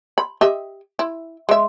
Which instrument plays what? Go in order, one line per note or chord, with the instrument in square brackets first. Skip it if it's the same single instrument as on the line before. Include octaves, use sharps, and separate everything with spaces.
[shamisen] B5
G4 D#5 E5
E4
G#3 E5